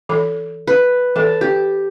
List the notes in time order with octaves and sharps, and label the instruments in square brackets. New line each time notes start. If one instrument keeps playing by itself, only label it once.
[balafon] E3 A4 B5
[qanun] B4
[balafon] E3 A4 [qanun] A5
[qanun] G4